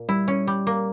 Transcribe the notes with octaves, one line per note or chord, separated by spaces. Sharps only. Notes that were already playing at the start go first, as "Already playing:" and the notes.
Already playing: A#2
G3 E4
C#4
G3
A#3